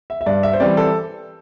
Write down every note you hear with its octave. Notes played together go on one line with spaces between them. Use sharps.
E5
E5
G2 D5
E5
C5
E3 G3 C4 D5
A4